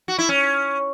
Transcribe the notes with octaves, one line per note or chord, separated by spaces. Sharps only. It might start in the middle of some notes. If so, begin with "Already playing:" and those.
F#4
E4
C#4